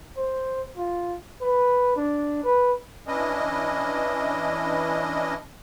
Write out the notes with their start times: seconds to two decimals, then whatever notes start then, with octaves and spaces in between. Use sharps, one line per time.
0.17 C5
0.77 F4
1.41 B4
1.96 D4
2.44 B4
3.07 E3 C#4 D4 E4 D#5